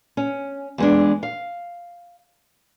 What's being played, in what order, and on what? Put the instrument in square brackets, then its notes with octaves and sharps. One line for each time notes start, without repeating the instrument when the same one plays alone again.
[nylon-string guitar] C#4
E2 G#3 D4
F5